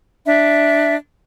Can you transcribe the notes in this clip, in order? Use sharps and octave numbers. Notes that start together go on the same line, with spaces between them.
D4 E5